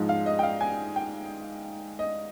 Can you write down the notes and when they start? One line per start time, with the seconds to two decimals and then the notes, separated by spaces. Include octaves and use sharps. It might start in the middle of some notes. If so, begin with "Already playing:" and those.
Already playing: G#2 F3 G#3
0.09 F5
0.26 D#5
0.39 G5
0.43 F5
0.61 G#5
0.96 G5
1.99 D#5